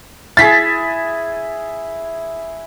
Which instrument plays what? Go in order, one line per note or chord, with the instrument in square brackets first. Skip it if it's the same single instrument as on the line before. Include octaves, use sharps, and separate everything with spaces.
[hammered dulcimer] E4 G#4 [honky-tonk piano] A6 B6